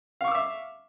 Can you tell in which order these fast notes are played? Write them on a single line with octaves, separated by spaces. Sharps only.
F5 C#6 D6 E6 E5